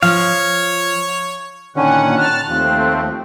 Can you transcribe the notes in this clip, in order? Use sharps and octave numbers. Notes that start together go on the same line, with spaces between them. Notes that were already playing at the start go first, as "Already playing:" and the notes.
F3 C#5 F5
A#2 D3 D#3 C#4 F#5 G#5
A5 F6 F#6
D#2 F3 A3 C4